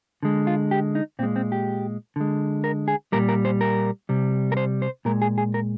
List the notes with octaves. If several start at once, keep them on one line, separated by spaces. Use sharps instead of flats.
D3 G#3
F4
G4
D#4
A#2 G#3 C4
C4
G4
D3 G#3
A#4
G#4
A#2 G3 A#4
A#4
C5
A#4
C3 G3
A#4
C5
C5
A#2 G#3 A#4
G#4
G#4
A#4